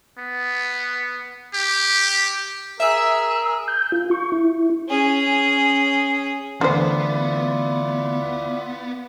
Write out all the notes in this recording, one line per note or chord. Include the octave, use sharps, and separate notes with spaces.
B3
G4
G#4 A#4 E5 E6
G6
F4
C#6
E4
C#4 G#4
D2 D3 E3 B3 E4 F4 C5 D5